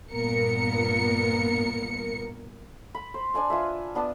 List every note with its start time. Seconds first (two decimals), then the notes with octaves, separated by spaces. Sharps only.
0.12 G2 A#2 B3 A#4 C#7
2.95 B5
3.14 C5
3.34 D4 D5 G#5 A5
3.50 F4 B4 E5
3.95 B3 D4 A5